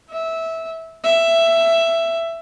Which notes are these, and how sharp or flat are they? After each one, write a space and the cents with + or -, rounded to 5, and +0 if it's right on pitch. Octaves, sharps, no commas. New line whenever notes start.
E5 -15
E5 +10